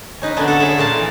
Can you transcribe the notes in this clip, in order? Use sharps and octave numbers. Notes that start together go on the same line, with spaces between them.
C#4 D#4 B4
D3 F#3 A#3 B3 C#4 D4
A4 F#5
C#4 G#4 D5 E5
A#2 F4 A#4 F#5 A5
E3